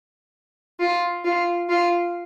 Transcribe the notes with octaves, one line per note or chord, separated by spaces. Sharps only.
F4
F4
F4